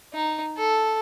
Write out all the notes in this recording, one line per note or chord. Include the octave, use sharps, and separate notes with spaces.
D#4
A4